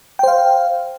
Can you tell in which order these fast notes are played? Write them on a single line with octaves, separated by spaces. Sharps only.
G5 C5 F5